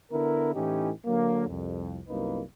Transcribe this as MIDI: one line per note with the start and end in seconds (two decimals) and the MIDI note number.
0.11 0.50 50
0.11 0.50 59
0.11 0.50 64
0.11 0.50 70
0.54 0.90 45
0.54 0.90 52
0.54 0.90 61
0.54 0.90 63
0.54 0.90 67
1.06 1.48 50
1.06 1.48 54
1.06 1.48 58
1.48 1.99 36
1.48 1.99 41
2.08 2.42 36
2.08 2.42 42
2.08 2.42 58
2.08 2.42 63
2.08 2.42 71